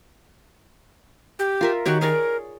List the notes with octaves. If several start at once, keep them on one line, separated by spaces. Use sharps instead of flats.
G4
F4 A#4 E5
D#3 F#4 G4 C#5
G#4 A#4 C#5 D5